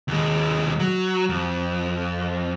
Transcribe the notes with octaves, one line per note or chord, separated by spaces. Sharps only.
D#2 G#3
F#3
F2